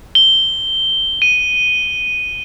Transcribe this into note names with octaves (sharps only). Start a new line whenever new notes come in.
G7
D#7